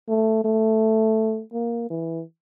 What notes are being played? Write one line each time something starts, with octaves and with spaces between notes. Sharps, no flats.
A3
A3
A#3
E3